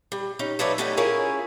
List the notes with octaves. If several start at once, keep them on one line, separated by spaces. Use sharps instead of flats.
G3
C#4 D#4
F3 D#4 B4 C#5 D5 E5
G3 A3 B3 C#4 D#4 E4
C#4 E4 F4 G#4 A#4 C#5